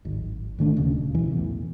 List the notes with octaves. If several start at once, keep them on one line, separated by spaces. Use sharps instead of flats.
D1 G#1
G#1 D#3 A3 D4
D#1 D2 C#3
F1 B1 E3
E2 A2